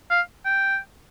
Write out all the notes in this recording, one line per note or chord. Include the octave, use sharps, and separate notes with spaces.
F5
G5